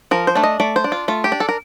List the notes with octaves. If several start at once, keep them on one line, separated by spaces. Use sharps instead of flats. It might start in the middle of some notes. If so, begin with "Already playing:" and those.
F3 A#4
C5
A3 D4
D#5
A3 D5
C5
D4
F4
A3 F4
G4
D4
A4
A#4